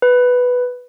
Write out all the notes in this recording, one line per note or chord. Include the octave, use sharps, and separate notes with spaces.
B4